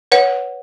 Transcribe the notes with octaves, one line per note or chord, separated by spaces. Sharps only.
B4 C#5 F#5